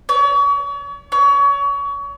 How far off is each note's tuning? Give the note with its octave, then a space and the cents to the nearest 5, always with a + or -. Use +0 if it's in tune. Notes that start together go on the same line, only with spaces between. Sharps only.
C#5 +40
C#5 +30